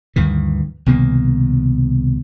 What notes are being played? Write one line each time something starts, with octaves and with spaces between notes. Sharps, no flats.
D2 G2 D#3 E3
C2 B2 D#3 A#3